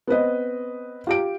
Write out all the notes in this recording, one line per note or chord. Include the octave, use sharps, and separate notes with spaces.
B3 C4 B4 D#5
F4 G4 D7